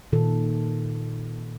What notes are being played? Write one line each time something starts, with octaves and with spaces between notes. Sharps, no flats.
A#2 D#3 A4